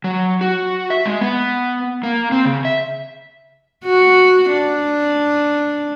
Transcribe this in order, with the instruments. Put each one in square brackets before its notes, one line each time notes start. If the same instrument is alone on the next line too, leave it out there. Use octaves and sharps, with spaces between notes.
[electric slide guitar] F#3
F#4
E5
G#3
B3
A#3
C4
C#3
E5
[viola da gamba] F#4
D4